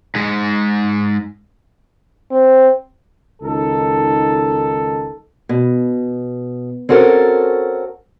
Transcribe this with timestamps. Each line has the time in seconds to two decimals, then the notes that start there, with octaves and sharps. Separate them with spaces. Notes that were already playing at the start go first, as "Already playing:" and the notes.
0.15 G#2 G#3
2.31 C4
3.42 C#2 D#3 D#4 A4
5.49 B2
6.89 C4 C#4 F#4 A4 A#4